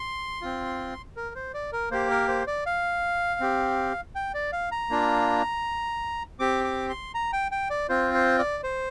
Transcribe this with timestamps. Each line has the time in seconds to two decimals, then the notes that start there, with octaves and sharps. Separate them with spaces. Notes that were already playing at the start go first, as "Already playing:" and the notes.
Already playing: C6
0.41 C4 F4
1.16 A#4
1.35 C5
1.54 D5
1.72 A#4
1.91 A#3 G4 C5
2.10 A#4
2.28 C5
2.47 D5
2.66 F5
3.40 C4 G4
4.15 G5
4.34 D5
4.53 F5
4.72 A#5
4.90 A#3 D4 F4
6.39 C4 G4 D6
6.64 D6
6.90 C6
7.15 A#5
7.33 G5
7.52 G5
7.70 D5
7.89 C4 F4 C5
8.14 C5
8.39 D5
8.64 C5